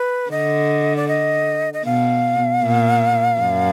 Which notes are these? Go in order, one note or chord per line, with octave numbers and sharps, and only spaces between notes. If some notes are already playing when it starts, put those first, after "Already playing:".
Already playing: B4
D3 D#5
D5
D#5
D#5
B2 F5
A#2
F#2